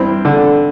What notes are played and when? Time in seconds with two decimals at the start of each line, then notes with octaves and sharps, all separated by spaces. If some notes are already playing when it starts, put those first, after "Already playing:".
Already playing: G2 C4 E4
0.25 D3